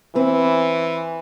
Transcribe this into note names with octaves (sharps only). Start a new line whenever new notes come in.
E3 C4 B4